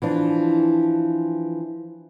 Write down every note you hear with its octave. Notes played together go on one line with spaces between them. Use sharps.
E3 F3 D4